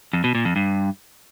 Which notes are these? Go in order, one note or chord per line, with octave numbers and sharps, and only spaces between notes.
F2
B2
A#2
F2
G2